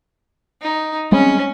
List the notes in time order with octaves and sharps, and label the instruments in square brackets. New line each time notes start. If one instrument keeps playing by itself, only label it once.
[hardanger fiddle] D#4
[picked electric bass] G3 G#3 C4 [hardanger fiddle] C#4